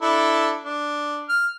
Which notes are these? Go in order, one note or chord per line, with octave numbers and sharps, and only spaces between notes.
D4 E4 A4
D4
F6